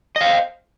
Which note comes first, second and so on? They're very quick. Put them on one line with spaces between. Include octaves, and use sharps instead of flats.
D#5 F5 C5